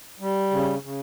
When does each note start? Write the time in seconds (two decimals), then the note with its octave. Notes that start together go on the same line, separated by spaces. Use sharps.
0.20 G3
0.51 C#3
0.82 C#3